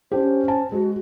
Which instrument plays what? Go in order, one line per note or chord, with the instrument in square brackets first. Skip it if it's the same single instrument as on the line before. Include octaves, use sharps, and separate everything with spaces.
[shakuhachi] C#4 [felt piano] D4 G4 [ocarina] C5
[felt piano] G#5 A5
[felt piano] G#3 [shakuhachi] F#4